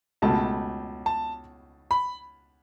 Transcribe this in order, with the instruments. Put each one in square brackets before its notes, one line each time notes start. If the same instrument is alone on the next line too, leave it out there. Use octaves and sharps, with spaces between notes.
[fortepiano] C#2 B2 A3 [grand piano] A5
[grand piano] A5
B5